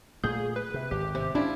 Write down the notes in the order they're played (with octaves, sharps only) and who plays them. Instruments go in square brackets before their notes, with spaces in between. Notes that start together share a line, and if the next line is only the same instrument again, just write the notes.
[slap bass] A#2 A3 [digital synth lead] G#4 [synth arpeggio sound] G6
[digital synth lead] B4
[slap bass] C3
[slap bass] G#1 [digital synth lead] G4
[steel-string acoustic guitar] C3
[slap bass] C#4 [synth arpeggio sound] D4 [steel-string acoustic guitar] E4 F4